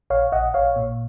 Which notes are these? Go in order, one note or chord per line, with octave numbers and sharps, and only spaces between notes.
A#1 C#5 F5
A#1 D#5 F#5
A#1 C#5 F5
A#2